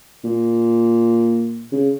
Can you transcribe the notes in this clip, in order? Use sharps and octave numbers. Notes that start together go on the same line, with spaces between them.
A#2
C#3